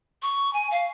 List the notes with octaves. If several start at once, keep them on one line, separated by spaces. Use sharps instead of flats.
C#6
G#5
F5